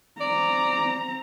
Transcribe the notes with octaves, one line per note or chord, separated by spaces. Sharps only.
C4 D5 A#5